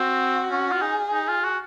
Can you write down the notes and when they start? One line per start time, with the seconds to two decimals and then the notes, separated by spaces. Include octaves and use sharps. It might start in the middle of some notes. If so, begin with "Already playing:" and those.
Already playing: C4 F#4
0.50 C#4
0.72 F4
0.81 D#4 G#4
1.12 D#4
1.28 F4
1.44 F#4